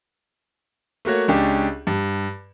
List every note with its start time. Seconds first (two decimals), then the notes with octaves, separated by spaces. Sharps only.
1.05 A3 A#3 F#4 C#5
1.28 C#2 C#4 D4 G4
1.87 G2